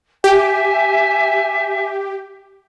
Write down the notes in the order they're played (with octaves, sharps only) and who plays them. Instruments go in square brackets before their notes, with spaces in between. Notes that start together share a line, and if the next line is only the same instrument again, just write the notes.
[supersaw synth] G4 [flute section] E5 G#5